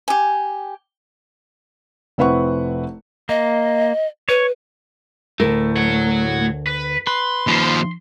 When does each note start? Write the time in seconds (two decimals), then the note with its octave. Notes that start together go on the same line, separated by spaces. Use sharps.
0.08 G4 G#5
2.18 F1 C4 E4 B4 F#5 C#6
3.29 A#3 D#5
4.29 B4 C#5
5.40 D2 A2 A3 A#4
5.76 C#5 F#5
6.67 B4
7.07 B4 C6
7.47 D#2 F3